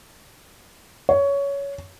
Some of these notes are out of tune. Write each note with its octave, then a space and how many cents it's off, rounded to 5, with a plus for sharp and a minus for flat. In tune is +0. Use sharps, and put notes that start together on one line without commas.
C#5 +15